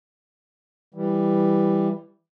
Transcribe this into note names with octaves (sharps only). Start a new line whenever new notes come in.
E3 G3